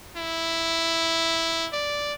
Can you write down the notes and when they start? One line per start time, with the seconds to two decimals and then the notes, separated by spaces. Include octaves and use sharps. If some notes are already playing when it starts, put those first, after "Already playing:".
0.17 E4
1.73 D5